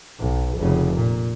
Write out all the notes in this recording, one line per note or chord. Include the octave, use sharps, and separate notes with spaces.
B1
F1 C#3
A#2